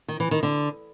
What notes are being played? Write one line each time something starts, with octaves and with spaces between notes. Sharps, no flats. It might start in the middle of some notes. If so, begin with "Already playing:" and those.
D#3
E3
D#3
D3